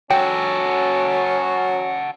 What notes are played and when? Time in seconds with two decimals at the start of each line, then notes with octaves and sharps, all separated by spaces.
0.11 F#3 C#4 F#4 A4 G5